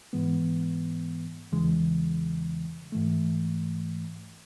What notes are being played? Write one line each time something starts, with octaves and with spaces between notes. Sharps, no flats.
G#2 E3 G#3 B3
E2 C#3 E3 G#3
G#2 E3 A3